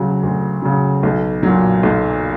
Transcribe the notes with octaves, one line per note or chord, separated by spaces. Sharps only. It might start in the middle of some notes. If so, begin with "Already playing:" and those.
Already playing: D2 C#3 F#3
D2
C#3 F#3
B1
A#2 F#3
B1